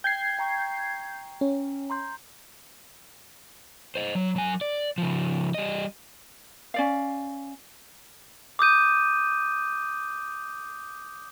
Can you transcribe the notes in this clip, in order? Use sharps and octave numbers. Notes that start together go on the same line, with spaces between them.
G5 G6 G#6 C7
G5 A#5 C#6
C#4
A#5 C6 G6
C5 D#5
F#3
F#3 G#5
D5
C#3 F3
G3 D#5
C#4 D5 F5
D6 D#6 G6 D#7